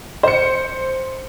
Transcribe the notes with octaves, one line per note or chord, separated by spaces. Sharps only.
C5 C#7